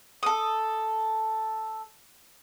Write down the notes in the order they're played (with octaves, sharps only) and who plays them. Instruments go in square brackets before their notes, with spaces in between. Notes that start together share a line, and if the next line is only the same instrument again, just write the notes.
[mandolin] A4 D#6